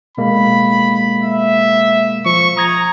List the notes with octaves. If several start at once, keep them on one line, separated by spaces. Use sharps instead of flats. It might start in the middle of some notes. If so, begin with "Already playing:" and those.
B2 G#3 A#3 B5
E5
F3 C#6
A#5 D#6 G#6 A#6